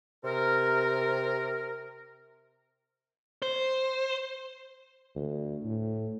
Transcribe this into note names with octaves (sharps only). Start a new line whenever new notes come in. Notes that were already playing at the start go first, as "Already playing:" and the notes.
C3 A#4
C5
D2
A2